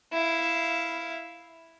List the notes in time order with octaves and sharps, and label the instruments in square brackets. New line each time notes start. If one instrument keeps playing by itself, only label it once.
[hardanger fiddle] E4 F5